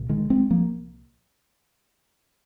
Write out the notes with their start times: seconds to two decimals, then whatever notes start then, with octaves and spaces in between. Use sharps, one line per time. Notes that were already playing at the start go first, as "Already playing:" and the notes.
Already playing: C2 A#2
0.09 D#3 G#3
0.30 G#3 C4
0.50 F3 A#3